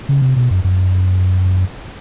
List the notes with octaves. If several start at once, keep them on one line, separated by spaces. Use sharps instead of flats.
C#3
C3
B2
F#2
F#2